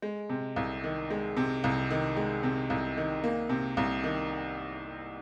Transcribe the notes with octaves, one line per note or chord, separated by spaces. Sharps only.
G#3
C3
C2
D#3
G#3
C3
C2
D#3
G#3
C3
C2
D#3
A#3
C3
C2
D#3